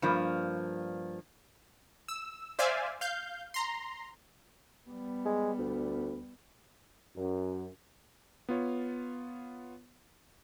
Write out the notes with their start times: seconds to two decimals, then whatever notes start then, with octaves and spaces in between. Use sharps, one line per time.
0.02 G2 F3 A#3
2.08 E6
2.59 C5 D5 E5 F5 G#5
3.01 F5 G6
3.54 A#5 C6
4.89 G3 B3
5.25 G#3
5.58 D2
7.15 F#2
8.49 B3 F4 C#5